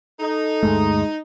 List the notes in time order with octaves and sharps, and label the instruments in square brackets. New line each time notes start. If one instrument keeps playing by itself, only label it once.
[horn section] D#4 [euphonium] A4
[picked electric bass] D2 G2 A3 [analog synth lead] G#3